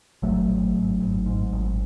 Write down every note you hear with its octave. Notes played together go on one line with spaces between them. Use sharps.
G#1 F#3 A3
G#1
G#1
G#1
G#2
G#1